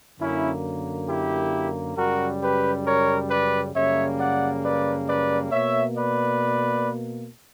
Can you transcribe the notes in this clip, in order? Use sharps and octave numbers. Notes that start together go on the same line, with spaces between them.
F#2 D3 A#3 C#4 E4
E4 G4
F#2 C#3 G3 F#4 A#4
G4 B4
A#4 C#5
B4 D5
F#2 C#3 G3 A#3 C#5 E5
D5 F#5
B4 D5
B4 D5
B2 A#3 C#5 E5
B4 D5